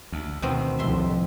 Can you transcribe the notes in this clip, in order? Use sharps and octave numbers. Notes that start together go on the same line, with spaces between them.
D2
D2 B2 D#3 C4
C2 F2 A2 E5 C6